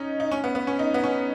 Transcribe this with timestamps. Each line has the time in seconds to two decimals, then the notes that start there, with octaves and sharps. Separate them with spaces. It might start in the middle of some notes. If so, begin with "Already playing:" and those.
Already playing: C#4 D#4
0.20 D#4
0.31 C#4
0.44 B3
0.55 B3
0.67 C#4
0.79 D#4
0.94 B3
1.04 C#4